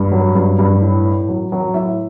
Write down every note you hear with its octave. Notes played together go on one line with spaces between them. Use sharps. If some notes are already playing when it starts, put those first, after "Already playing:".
Already playing: G2
F#3
G2
G2
A2
A2
F#3
F#3
A2 E5